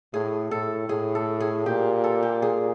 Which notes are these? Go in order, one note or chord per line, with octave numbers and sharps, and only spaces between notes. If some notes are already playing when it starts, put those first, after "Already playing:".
A2 G#4
A2 A4
A2 G#4
A4
G#4
A#2 G4
A4
G4
G#4